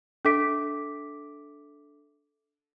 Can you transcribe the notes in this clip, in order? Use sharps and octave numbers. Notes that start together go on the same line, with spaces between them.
D4 A4 E5 D6 B6 D7